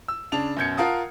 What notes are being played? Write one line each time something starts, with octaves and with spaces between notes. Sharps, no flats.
E6
C#3 D4 A5 F7
F#2 B2 G6 G#6 C#7
F4 A#4 F5 F#5 A5 D#6